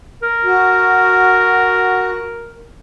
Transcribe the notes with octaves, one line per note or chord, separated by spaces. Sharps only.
A#4
F#4